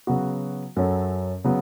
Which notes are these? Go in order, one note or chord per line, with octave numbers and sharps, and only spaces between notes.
C#3 F#3 B3 F#4
F#2 F#3 C#4 A4
C#3 F#3 B3